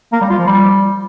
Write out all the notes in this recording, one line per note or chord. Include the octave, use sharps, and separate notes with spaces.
A#3
G3
F4
F3
G3